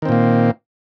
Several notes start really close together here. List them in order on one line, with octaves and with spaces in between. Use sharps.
D#3 C4 A#2 A#3